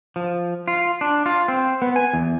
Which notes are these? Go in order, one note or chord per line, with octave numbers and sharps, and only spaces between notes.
F3
F4
D4
F4
C4
B3
G#5
E2